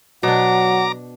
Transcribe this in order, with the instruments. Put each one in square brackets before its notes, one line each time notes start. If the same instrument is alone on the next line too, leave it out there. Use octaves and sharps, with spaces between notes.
[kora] B2 D4 [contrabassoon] F#3 [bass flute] F#5 [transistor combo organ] A#5 D6